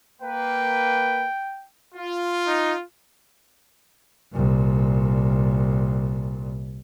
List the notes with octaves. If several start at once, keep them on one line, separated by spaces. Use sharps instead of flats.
A#3 B4 G5
F4
D#4
C2 A#2